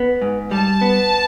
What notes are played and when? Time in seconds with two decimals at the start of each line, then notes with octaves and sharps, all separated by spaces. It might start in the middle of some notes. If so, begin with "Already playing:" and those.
Already playing: B3
0.22 G#2
0.51 G3 A5
0.81 B3